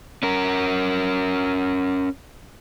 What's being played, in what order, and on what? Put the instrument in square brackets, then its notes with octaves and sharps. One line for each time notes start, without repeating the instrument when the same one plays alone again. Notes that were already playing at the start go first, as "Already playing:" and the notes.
[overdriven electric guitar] C#4 A#4